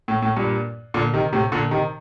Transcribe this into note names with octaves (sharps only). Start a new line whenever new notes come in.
A2
A2
G2 A#2
A#2 D3
C3 D#3
A2 C3
A#2 D3
C3 D#3